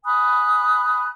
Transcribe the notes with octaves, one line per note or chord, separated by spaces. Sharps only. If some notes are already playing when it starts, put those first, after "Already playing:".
G#5 B5 D#6 F#6